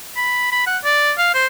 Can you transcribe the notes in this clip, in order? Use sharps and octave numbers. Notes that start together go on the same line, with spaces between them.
B5
B5
F#5
D5
F5
C5